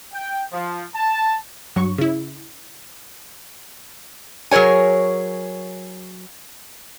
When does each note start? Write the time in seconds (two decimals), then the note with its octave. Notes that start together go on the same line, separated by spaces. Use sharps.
0.14 G5
0.53 F3
0.95 A5
1.76 G2 F#3 C#6
1.98 C#3 E4
4.51 F#3 G#4 A#4 C#5 G#5